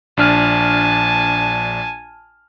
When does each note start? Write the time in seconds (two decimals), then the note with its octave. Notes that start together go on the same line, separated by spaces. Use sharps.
0.17 A#1 D4 G#5 A5 F6